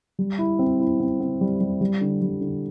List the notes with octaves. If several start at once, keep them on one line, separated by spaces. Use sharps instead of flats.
G3
E4
C4
E4
C4
C4
G3
G3
G3
D3
G3
D3